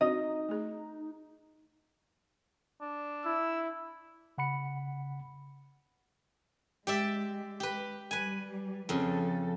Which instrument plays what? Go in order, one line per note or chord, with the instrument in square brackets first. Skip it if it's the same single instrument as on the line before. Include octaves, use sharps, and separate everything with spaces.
[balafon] C4 D4 F#4 [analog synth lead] D#4 [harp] D#5
[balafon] A3 G#4
[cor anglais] D4
[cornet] E4 [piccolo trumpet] E6
[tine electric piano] C#3 F#5 B5 C#7
[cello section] G#3 [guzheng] G4 D5 E5
[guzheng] G4 B4
[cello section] G3 [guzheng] B4 G#5
[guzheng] F2 C#3 [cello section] F3 A4